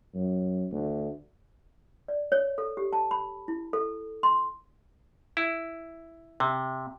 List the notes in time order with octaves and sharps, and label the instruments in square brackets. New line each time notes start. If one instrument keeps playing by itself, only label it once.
[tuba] F#2
D2
[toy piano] D5
C#5
A4
G4
A5
B5
E4
A4
C6
[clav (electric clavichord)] E4
C3